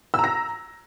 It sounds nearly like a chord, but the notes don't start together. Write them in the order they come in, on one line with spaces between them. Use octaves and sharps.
E6 A#5 A#6